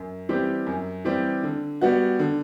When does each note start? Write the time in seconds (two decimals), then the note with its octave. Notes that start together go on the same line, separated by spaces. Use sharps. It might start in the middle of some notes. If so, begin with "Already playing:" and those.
Already playing: F#2
0.29 E3 G3 C4 G4
0.66 F#2
1.05 E3 G3 C4 G4
1.43 D3
1.81 G3 B3 F#4
2.19 D3